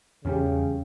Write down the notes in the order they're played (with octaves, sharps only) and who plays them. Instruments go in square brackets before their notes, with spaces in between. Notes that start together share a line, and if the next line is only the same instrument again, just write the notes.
[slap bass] E2 E3 G3 [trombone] C#3 [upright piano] C#4 G4